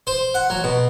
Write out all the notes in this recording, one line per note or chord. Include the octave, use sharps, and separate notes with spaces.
C5
F#5
F#3
B2